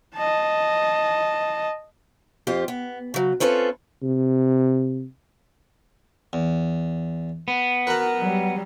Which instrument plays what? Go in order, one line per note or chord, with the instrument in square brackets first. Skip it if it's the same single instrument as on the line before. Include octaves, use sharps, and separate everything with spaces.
[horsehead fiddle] D#5 A5
[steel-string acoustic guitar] F2 F4 G4 C5
B3
C#3 F#3
C4 C#4 F4 A4 B4
[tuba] C3
[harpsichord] E2
[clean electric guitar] B3
[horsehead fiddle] F#4 A#4 [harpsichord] B4 F#5
[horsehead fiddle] F#3 G3